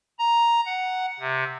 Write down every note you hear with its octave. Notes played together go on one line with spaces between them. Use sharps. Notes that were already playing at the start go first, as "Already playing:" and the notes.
A#5
F#5
C3